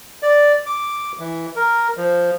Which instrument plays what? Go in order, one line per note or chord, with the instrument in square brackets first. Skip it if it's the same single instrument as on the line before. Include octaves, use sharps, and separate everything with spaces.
[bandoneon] D5
D6
E3
A#4
F3